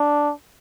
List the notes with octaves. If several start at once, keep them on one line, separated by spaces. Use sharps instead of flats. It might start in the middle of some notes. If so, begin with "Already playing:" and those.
Already playing: D4